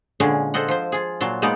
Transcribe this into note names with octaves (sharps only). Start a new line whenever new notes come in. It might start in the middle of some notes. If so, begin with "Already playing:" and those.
A#2 D3 G#3 C#4 G#4
A4 C5 D#5 F#5
F3 C5
F4 G#4
A#2 F#3 A5 C6
G#3 A#3 B3 D#4 D5